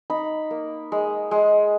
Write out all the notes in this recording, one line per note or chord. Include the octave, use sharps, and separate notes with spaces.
D#4 B5
A#3
G#3
G#3